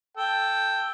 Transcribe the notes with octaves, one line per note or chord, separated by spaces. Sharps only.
A4 G5